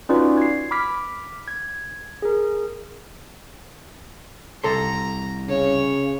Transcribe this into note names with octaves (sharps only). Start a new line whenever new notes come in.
C#4 D#4 F4 F#4 B4 D5
G#6 C7
B5 D6 F6 B6
G#6
G#4 A#4
C2 A4 A#5 C6
C#3 C#5